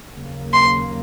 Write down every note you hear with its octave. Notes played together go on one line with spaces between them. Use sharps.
D#2 C#3 F#3 A#3
C6